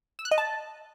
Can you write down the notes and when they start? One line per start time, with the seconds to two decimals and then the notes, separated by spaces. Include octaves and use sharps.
0.19 E6
0.25 F#6
0.31 D#5
0.38 A5